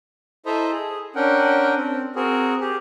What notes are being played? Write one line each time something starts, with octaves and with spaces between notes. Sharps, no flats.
E4 A4 C5 D#5 E5 A#5
G#4
C#4 D4 A#4 F#5 G5
C4
C4 F#4 G#4 A#4
G4 G#4